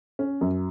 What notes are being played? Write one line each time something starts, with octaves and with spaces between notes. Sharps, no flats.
C#4
F#2